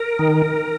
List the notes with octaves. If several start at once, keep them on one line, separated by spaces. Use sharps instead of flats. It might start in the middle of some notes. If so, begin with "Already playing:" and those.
Already playing: A#4
D#3